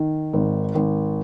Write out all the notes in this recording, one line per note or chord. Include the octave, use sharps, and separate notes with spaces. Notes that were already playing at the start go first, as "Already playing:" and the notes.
Already playing: D#3
G#1
G#1